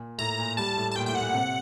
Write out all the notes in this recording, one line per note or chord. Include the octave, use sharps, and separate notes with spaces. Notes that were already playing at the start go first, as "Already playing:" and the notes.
Already playing: A#2
A2 A#5
A#2
G3 A5
A2
A5
A#2 G5
A2 G5
F#5
A#2
C3